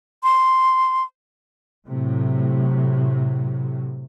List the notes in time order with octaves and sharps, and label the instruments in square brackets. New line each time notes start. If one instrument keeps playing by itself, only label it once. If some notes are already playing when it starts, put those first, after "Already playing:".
[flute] C6
[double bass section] A2 C3 F#3